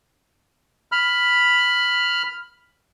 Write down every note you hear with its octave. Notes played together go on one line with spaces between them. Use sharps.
B5 F6